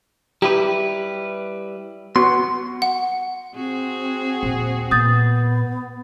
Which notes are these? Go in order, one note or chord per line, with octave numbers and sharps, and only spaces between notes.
G3 E4 G4 B4
B3 F#4 C6
F#5
C4 F#4 G#4
D#1
A#2 B3 D#6 G6 A6